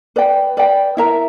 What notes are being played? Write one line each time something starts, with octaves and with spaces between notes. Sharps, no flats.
B4 D5 G5
B4 D5 G5
E4 A#4 E5 A#5